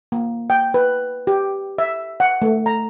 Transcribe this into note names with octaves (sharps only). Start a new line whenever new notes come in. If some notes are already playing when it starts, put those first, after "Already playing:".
A#3
G5
B4
G4
E5
F#5
A3
A#5